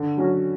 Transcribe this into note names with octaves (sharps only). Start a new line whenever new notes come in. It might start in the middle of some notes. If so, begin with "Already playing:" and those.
Already playing: D3
F#3 C#4 F#4